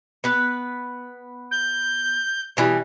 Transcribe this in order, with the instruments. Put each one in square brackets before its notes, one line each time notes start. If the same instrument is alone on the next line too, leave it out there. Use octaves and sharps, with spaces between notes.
[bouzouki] B3 B4
[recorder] G6
[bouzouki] B2 E3 G3